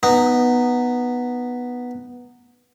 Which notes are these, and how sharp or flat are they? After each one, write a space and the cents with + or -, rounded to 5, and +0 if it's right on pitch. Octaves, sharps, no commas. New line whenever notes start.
B3 -5 D#4 -15